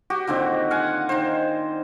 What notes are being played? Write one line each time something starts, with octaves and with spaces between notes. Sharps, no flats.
F#4 G4
A#2 D3 D#3 C4
F5 F#5 G#5
D#3 C5